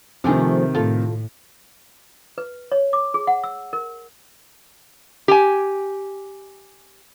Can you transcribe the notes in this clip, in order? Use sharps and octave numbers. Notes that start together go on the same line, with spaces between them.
C3 D#3 F3 A3 G#4
A2 F4 A4
B4
C#5
D6
G#4
F#5
E6
A#4
G4 G#5